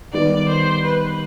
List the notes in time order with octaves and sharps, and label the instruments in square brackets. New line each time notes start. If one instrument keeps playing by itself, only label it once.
[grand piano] D#3 G3 B3 [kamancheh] D5
[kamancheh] C5
B4